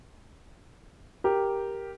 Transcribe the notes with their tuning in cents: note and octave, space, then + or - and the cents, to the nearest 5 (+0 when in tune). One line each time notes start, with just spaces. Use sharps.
G4 +0 A#4 +0